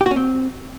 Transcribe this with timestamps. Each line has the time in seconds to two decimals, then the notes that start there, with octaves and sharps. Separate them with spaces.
0.01 G4
0.06 F#4
0.11 C#4
0.16 C4